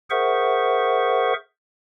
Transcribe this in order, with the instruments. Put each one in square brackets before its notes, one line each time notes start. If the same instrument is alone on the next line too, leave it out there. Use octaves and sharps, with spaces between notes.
[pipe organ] G#4 A#4 C5 E5 F#5 C#6